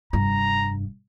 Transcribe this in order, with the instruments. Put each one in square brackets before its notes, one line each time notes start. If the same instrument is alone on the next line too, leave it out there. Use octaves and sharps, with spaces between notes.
[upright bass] F1 G2 [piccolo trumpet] A#5